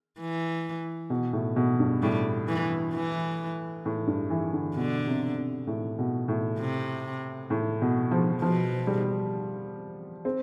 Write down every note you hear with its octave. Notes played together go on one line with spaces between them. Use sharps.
E3
B2
A2
B2
G2
A2 G3
E3
E3
A2
G2
E3
D3
B2 D3
C3
C3
A2
B2
A2
C3
A2
B2
F3
B2 F3
G3
C4